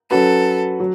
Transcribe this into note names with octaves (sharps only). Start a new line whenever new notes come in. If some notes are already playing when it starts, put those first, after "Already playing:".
F#3 C#4 F#4 A4 B4
F#3